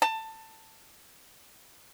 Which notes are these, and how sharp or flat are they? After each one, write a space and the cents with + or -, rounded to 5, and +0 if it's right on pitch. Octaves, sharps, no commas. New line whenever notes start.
A5 +20